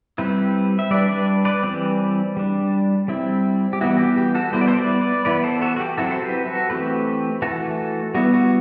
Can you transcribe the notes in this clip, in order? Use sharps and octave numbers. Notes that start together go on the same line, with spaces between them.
G3 C4 E4 G4 B4
E5
G3 D4 B4 D5
B4 D5
B4 D5
E3 G3 C4
G3 D4
G3 C4 E4
G4
E3 G3 B3 E4 F#4
G4
G4
F#4 A4
G3 B3 E4 C5
D5
A4 C5
B4 D5
B4 D5
E3 B3 E4 B4 D5
B4
A4 C5
F#4 A4
F#4
G4
F#3 C4 E4 F#4 A4
C5
G4 B4
F#4 A4
E3 A3 C4 G4 B4
E3 A3 E4 F#4 A4
G3 B3 E4 F#4
F#4